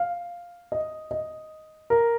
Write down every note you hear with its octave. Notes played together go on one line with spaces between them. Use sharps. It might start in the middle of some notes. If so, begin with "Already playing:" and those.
Already playing: F5
D#5
D#5
A#4